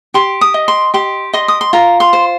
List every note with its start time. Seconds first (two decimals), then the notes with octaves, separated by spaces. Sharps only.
0.14 G4 C6
0.41 D#6
0.54 D#5
0.68 C6
0.94 G4 C6
1.33 D#5 C6
1.48 D#6
1.61 C6
1.73 F4 A#5
2.00 C6
2.13 C5